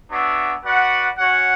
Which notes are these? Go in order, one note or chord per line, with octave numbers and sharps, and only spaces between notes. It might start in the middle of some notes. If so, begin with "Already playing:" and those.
B3 D4 F#4 C#5 E5
F#4 B4 D5 F#5
C#4 F#4 C#5 F#5